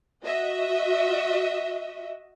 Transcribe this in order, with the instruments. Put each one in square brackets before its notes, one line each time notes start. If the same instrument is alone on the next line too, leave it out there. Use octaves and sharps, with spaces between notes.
[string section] F#4 D#5 E5